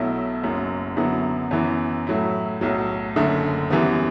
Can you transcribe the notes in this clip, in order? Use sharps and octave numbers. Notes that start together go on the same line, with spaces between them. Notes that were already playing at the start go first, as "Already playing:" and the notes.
Already playing: B1 B2 F#3 A3 E4
F#1 F#2 F#3
F#2 D3 F#3 B3 E4
F#2 E3 B3 E4
A2 F#3 A3 E4
B1 A2 F#3
F#1 F#2 D3 A3
F#2 E3 G3 B3